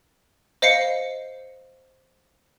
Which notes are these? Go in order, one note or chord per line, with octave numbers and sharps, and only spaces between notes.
C5 D#5 F5 C7 C#7